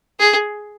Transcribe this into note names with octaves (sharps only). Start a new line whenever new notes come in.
G#4